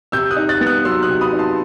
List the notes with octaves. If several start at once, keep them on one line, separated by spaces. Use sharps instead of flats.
C3 E6 G6
D#6 F#6
D#4
F#6 A6
B3
D#6 F#6
F#3 C6 E6
D#6 F#6
C3
B5 D#6
D#4
A5 C6